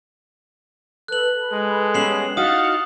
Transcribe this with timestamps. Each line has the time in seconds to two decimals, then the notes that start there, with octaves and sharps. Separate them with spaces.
1.08 A4 B4 F#6 F#7
1.53 G#3
1.94 G3 B3 C#4 C7 E7 F#7
2.37 D#4 E4 F#4 F5 D#6 F6 A6 C#7